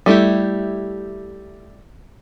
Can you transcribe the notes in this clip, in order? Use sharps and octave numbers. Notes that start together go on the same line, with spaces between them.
G3 A3 E4 G4